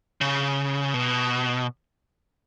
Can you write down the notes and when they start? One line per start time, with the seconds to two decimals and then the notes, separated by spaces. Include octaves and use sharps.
0.21 C#3
0.94 B2